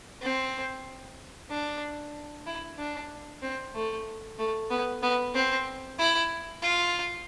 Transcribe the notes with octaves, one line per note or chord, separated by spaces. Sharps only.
C4
D4
E4
D4
C4
A3
A3
B3
B3
C4
E4
F4